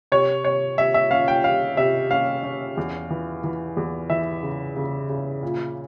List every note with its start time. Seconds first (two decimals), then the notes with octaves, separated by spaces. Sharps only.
0.12 C3 C#5
0.44 C3 C#5
0.78 C3 E5
0.94 E5
1.11 C#4 F5
1.28 G5
1.44 G3 F5
1.77 C3 E5
2.11 C#4 F5
2.43 C#4
2.77 E2
3.10 E3
3.44 E3
3.77 E2
4.10 E3 E5
4.43 C#3
4.76 C#3
5.09 C#3
5.43 A#2